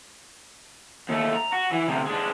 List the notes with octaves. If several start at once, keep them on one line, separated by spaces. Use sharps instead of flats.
D#2 A3
A#5
F#4
E3
D2 C3
G#3 D4